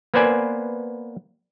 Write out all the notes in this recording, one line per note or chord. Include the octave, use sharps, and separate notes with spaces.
A#3 B3 B4 C5 D5 G#5